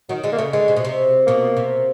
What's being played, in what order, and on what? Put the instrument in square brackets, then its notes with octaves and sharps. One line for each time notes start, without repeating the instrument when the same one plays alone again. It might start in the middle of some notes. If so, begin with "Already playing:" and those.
[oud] D#3 [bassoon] F#3
[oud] D3 [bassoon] G#3
[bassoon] A#3
[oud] C#3 [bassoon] A3
[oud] D3 [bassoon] G#3
[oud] C3
B2
C3
[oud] B2 [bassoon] A#3
[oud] C3